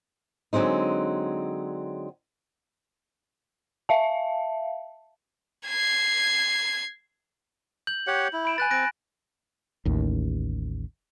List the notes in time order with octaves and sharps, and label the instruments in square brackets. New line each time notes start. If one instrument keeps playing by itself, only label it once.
[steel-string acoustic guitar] D3 F#3 G#3 C4 D#4
[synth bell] E5 F5 A5
[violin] G#6 C7
[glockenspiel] G6 F#7
[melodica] G4 C#5 F#5
E4
[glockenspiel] B5 D7 E7
[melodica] B4 [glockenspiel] G#5 F#6 A6
[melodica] C4 [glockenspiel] F#6 A#6 D7
[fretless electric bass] A1 D#2